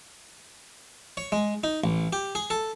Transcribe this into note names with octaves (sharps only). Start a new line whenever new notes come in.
C#5
G#3
D#4
A1
G4
G#4
A4